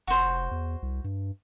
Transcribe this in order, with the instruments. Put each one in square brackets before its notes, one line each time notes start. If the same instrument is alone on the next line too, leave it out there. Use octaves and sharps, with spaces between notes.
[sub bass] F1 [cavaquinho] F#4 C5
[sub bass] E2
C2
G2